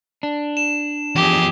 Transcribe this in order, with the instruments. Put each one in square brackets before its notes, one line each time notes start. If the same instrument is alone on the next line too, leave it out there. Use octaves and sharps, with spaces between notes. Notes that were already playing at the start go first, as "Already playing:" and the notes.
[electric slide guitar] D4
[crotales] E7
[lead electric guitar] E2 F3 [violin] G4 G#4